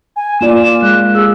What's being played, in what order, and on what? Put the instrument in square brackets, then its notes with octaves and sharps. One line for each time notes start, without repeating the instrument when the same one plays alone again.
[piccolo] G#5
[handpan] A#3 F4 D5 [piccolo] E7
[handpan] G#3 [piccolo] F#6
[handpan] G#4 [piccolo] E6